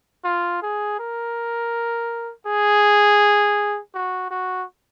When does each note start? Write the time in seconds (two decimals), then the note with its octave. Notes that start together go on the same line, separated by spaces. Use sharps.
0.25 F4
0.62 G#4
0.99 A#4
2.47 G#4
3.95 F#4
4.31 F#4